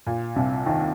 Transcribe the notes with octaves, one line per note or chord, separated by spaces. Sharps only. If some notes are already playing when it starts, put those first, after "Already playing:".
A#2
C2 C3
D#2 D#3